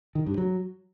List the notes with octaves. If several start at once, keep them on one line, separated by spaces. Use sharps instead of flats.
D#3
G2
F#3